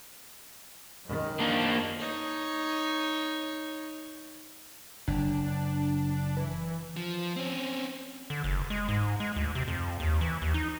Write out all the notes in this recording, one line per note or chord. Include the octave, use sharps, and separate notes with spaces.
F#2 D#3
A#3 D4
D#4 C#5
F#1 D4
E3
F3
C4 C#4
D3
F#1
G#3
G#2
G#3
D2
C3
F2
D#2
E3
D#2
D#4